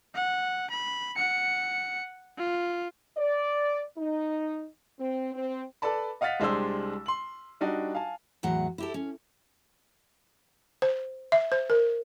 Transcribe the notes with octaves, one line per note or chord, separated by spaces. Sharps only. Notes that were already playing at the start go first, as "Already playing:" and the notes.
F#5
B5
F#5 C#7
F4
D5
D#4
C4
C4
A4 B4 D5 A5 B5
D#5 F5 F#5 F6 A6 B6
C2 G#3 D4 G4 C5 E6
C6 F#7
G3 D4 D#4 F#4
F5 G#5 A5
E2 A2 F#3 F#5
E4 G4 A4
C#4
C5
E5
C5
A#4